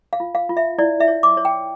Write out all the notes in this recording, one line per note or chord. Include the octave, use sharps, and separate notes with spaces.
F5
F4
F5
F4
E5
E4 D5
E5
C#5
D6
C#5
G5